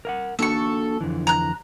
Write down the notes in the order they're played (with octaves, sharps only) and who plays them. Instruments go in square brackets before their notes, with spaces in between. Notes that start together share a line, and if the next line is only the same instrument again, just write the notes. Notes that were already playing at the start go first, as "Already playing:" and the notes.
[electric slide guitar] A#4 F5 F#5
[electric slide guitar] A#3 D4 F#4 [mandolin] A4 C#6
[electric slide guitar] F2 D3 E3
[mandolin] A#5 F#6